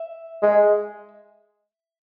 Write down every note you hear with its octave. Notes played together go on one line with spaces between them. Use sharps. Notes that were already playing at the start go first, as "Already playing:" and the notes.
Already playing: E5
G#3